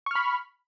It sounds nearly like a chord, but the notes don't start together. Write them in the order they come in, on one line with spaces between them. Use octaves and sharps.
C#6 F6 B5